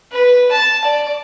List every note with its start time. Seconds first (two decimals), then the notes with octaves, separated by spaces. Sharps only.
0.12 B4
0.52 A5
0.84 D5